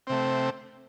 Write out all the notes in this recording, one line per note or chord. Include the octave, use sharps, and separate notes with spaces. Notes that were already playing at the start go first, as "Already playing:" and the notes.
C3 A3 C4